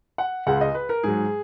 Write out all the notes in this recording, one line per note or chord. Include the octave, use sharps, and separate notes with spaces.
F#5
C#2 C#3 G#3 F#5
D#5
B4
A#4
G#2 F#3 G#4